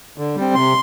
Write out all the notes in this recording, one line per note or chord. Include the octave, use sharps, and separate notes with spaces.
D3
G3 C4
C3 C6